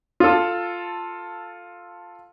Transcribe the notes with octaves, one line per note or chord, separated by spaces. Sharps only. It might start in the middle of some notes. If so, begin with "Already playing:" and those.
F4 A4